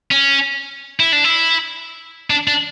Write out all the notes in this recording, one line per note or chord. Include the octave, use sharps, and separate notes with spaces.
C#4
E4
D4
E4
D4
D4